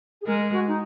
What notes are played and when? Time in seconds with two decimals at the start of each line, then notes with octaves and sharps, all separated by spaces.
0.22 G#4
0.26 G#3 A#4
0.52 F#4
0.68 D#4